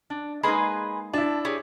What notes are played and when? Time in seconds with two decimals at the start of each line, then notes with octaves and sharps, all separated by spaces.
0.10 D4
0.43 G#3 A#3 D#4 G#4 B4 C6
1.14 D4 E4 A5
1.45 C#4 G4 G#4